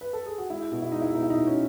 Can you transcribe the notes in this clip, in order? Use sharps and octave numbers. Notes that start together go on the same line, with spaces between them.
B4
A4
G#4
F#4
G#3 E4
B2
E4
G#3 D#4
E4
B2 D#4
E4
D#4
B2
C#4